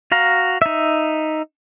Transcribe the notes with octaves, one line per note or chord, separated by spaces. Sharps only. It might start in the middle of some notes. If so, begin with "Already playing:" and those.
F#4 F5 A#5
D#4 E5